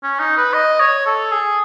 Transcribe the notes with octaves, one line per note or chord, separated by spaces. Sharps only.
C#4
D#4
B4
D#5
C#5
A4
G#4